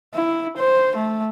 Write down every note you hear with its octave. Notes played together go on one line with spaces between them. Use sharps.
E4
C5
A3